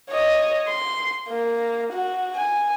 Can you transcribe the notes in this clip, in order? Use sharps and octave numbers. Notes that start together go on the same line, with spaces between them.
C#5 D#5
C6
A#3
F#4
G#5